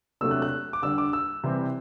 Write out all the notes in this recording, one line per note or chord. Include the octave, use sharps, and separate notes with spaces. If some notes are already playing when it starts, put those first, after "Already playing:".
C3 F#3 A3 D4 E6
F#6
F#6
D6
D3 G3 D4 E6
D6
E6
C3 E3 G3 C4